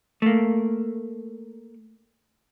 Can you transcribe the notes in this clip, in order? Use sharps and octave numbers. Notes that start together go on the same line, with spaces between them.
A3 A#3